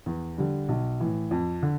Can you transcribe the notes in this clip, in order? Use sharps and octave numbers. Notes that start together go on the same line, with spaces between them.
E2
D3 G3 D4
B1
A2 E3
F2
D3